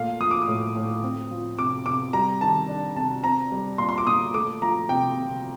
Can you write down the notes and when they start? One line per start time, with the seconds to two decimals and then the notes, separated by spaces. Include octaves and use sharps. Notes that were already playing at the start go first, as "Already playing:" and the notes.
Already playing: A#2 A3 F5
0.20 F3 D#6
0.31 D6
0.42 D#6
0.48 A2
0.76 A2
1.03 C4
1.31 F3
1.58 C3 D6
1.86 C3 D6
2.13 G3 A#5
2.41 D#3 A5
2.68 D4
2.96 C3 A5
3.23 C4 A#5
3.52 G3
3.78 A#2 C6
3.89 C6
3.98 D6
4.07 A#2 D#6
4.34 A3 D6
4.62 F3 A#5
4.89 C3 G5
5.17 C3